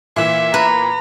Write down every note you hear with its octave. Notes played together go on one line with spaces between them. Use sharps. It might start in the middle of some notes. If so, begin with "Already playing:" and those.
A#2 E3 E5
B4 A#5